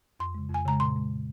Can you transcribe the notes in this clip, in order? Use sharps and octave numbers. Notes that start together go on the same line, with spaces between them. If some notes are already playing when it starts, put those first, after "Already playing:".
F2 C6
C#3 G#3
F2 G#5
C#3 G#3 A#5
A#2 C6
G#3
A#2